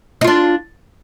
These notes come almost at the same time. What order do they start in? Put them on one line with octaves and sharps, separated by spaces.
D#4 F4 D4